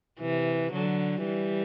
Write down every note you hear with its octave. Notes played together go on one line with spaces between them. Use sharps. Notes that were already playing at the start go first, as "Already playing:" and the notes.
C3 E3
D3 F#3
E3 G3